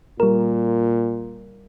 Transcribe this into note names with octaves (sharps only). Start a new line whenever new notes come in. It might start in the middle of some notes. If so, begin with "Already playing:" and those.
A#2 G3 A#4